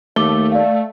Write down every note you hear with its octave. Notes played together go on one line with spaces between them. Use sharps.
D#2 A3 D6 G7
D5 F5